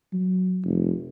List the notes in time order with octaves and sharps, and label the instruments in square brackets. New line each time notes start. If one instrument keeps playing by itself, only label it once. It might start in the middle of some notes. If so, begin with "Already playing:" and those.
[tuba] F#3
F1